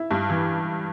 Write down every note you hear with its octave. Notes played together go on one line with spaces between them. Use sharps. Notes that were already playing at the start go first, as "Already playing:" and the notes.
Already playing: E4
G2
E3